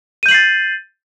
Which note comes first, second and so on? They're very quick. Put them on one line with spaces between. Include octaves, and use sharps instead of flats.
D#7 G6 F#7 C7 A6